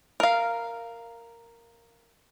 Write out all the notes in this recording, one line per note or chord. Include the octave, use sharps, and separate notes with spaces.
A#4 F5